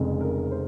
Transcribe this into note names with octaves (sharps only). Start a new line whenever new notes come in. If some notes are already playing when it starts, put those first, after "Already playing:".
Already playing: F1 F2 C#3 G#3
A#4
C5